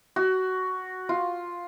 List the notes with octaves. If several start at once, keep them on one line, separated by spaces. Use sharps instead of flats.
F#4
F4